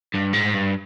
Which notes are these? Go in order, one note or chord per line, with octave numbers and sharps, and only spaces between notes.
G2
G#2
G2